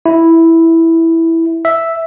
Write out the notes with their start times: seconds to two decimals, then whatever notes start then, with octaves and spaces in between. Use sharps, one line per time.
0.06 E4
1.65 E5